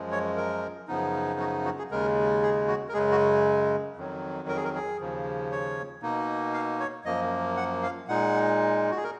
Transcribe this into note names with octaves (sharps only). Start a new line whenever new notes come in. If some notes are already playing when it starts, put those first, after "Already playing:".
Already playing: F#2 F3 G#3
C#5
A#4
F#2 C#3 F3 B3 D#4
F#4
F#4
G#4
D#2 C#3 G#3 A#4
G#4
F#4
A#4
F#2 C#3 G#3 G#4
F#4
F2 D#3 F#3
A#4
G#4
A#4
G#4
D#2 C#3 F3
C#5
B2 A#3 D#4
F5
C#5
F#2 F3 A#3 D#5
F#5
F5
A#2 G#3 D#4 F#5
F#4
G#4
A#4